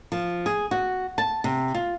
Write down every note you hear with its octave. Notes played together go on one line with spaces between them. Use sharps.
F3
G#4
F#4
A5
C3
F4